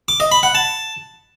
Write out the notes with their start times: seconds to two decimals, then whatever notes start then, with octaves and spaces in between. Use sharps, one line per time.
0.08 D6
0.20 D#5
0.32 B5
0.43 F#5
0.55 A5